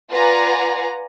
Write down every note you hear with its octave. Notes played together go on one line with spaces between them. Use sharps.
F4 B4 D5 F#5 G#5 A#5